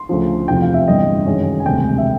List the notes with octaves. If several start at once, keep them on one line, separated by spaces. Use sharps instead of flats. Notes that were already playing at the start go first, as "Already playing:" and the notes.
Already playing: C6
D2 C#3 F3
F1 E2 C3 F3 G5
F5
E5
G1 G2 E3 D#5
F#2 D#3 G#3 C#4
G#5
E1 D2 C3 G5
E5